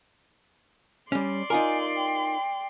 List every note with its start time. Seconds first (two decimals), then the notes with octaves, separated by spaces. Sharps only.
1.12 G3 C#4 D5 C6
1.50 D#4 F4 A#4 G#5
1.96 G5